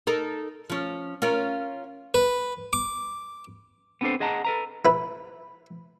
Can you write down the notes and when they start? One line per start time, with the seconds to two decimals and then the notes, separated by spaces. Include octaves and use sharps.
0.07 D#4 A4 A#4
0.70 F3 C#4
1.22 C#4 F4 A#4
2.14 B4
2.73 D6
4.01 B3 C4 D4 G4 A4 C5
4.20 G#4 D#5 F#5 A5 A#5
4.45 A4 B4 A#5
4.85 E4 B4